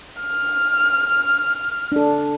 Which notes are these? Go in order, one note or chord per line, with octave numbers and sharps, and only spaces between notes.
F6
D4 A4